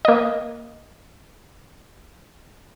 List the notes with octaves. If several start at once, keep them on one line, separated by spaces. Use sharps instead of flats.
A#3 D#5